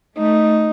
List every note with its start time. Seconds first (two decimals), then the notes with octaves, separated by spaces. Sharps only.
0.18 A3 D#4